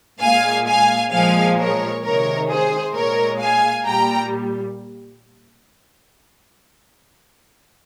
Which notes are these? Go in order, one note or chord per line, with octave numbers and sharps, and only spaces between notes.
A#2 G#3 F5 G#5
F5 G#5
A#2 F3 G#3 F5 G#5
A#4 C#5
C3 D#3 G#3 A#4 C#5
G#4 C5
A#2 G#3 A#4 C#5
F5 G#5
A#2 G3 G5 A#5